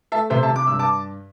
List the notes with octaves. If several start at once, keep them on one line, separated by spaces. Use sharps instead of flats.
A3 E5 A5
C3 C5 E5
E5 A5
C3
D6
G2 E6
A5 D6